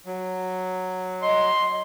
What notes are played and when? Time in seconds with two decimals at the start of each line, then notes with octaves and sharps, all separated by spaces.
0.06 F#3
1.22 D#5 C6